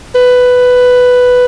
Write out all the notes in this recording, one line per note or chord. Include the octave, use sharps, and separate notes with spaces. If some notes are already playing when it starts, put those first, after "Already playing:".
B4